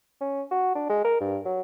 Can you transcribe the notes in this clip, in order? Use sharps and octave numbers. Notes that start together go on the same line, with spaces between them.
C#4
F#4
D4
G#3
A#4
G2
F#3